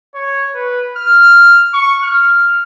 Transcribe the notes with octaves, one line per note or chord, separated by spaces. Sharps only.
C#5
B4
F6
C#6
F6